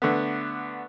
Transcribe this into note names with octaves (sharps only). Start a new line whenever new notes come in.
D3 A3 B3